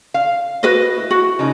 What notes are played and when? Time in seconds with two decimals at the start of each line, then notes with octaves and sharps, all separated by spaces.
0.14 F5
0.63 F#4 B4 D#5
0.98 E4
1.11 F#4
1.39 C#3 F3 D#4